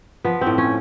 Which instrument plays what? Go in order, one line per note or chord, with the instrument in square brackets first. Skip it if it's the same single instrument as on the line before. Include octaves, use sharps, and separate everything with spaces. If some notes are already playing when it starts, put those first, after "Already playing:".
[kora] F3 B3
C4
A2
C#4